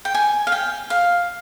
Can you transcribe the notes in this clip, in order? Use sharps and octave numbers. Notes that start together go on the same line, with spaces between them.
G5
G#5
F5
G5
F5